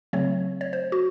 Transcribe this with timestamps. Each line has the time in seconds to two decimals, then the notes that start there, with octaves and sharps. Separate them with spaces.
0.13 C#3 F#3 A3 C4 C#5
0.61 C#5
0.73 C5
0.92 F#4